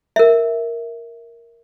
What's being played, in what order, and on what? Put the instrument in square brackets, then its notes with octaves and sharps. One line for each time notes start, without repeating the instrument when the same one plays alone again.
[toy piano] A#4 E5